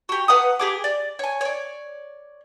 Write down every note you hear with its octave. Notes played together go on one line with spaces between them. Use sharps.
F#4 G4
B4 F#5 A#5 D#6
G4 G#4 D6
D5
C#5 G#5
C#5 D5